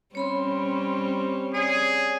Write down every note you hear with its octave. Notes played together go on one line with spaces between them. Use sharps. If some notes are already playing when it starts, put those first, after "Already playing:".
G3 C4 C#4 C#5 B5 C6
G#4 C#5 D5